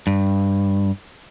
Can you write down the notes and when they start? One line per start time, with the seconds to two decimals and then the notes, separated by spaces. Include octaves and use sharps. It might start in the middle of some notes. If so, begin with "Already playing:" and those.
0.07 G2